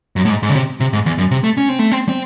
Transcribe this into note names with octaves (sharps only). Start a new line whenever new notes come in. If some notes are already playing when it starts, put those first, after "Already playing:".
F#2
A2
G#2
G#2
C#3
C3
C3
G#2
E2
F#2
C3
A3
C#4
C4
A3
C4
C4